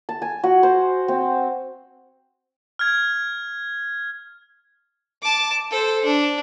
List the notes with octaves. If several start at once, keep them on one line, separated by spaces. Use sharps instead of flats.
A5
G#5
F#4
C5
C4
F6 G#6
A5 D6
A4 C5
D4